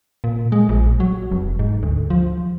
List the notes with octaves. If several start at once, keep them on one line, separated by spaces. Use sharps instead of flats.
A#2
G#3
A#1
F#3
F1
G#2
D2
F3